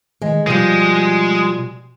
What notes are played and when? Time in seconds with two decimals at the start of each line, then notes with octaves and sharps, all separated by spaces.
0.22 D#3 G#3
0.47 B2 F3 G3 G#3